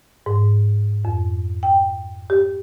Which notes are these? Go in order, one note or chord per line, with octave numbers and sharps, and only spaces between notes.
G#2
F2
G5
G4